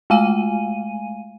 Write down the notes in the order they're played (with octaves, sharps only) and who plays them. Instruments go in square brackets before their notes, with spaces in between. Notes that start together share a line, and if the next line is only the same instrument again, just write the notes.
[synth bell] G#3 A3 F5 G#5 D#7